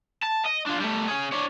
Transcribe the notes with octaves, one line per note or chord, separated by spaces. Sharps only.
A5
D#5
D4 F4
G3 A3
C#4 G#4
D4 C#5